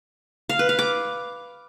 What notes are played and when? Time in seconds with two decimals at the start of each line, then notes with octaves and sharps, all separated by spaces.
0.49 F5
0.59 B4
0.69 F5
0.79 D6